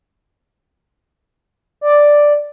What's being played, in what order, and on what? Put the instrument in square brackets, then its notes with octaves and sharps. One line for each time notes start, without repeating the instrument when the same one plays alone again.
[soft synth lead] D5